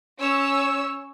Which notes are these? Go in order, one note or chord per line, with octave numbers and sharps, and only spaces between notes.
C#4 C#5 E6